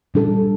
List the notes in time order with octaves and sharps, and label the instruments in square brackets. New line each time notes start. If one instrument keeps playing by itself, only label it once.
[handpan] A#2 G3 D4 A4